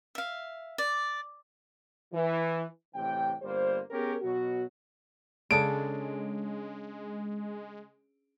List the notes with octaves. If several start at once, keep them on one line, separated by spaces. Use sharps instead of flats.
E5 F5
D5
E3
A1 C3 E3 G5
G1 G3 A#3 C5
B3 C#4 G4 G#4 A#4
B2 F#3 F#4
C#3 G#3 D4 A4 D7